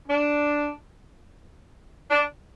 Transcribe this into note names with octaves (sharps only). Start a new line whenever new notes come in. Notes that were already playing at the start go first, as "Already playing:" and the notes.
D4
D4